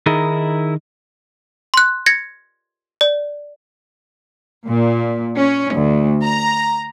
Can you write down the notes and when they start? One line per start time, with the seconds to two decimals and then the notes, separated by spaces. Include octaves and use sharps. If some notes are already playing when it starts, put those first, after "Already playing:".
0.06 D#3 D#4 E4 G#4 A#4
1.74 C6 F#6
2.06 G#6 A#6 C#7
3.01 D5
4.67 A#2
5.38 C#4
5.75 D2
6.22 A#5